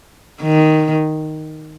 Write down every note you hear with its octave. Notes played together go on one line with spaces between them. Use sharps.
D#3